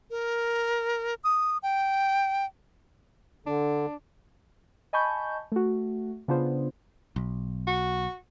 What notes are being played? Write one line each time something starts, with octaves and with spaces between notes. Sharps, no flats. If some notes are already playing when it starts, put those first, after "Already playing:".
A#4
D#6
G5
D3 D4
D#5 G#5 A5 B5 C#6 G6
A3 F#4
C#3 B3 D4 F4 C5
B1
F#4